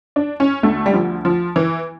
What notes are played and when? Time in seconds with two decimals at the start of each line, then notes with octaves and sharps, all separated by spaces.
0.16 D4
0.40 C#4
0.63 D2 D3 A3
0.86 G3
0.94 F3
1.25 F3
1.56 E3